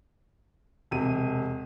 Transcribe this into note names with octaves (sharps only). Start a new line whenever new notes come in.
E1 C3 D#7